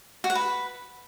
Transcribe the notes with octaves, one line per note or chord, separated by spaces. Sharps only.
F#4
F#5
B4